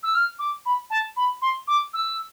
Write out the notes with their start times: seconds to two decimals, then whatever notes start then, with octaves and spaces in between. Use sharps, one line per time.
0.03 E6
0.15 F6
0.39 D6
0.66 B5
0.90 A5
1.16 B5
1.42 C6
1.67 D6
1.93 E6